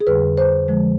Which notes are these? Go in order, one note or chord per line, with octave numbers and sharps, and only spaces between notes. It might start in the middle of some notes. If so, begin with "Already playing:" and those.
G#4
F2 D3 G3 B4
C5
D3 F3 G#3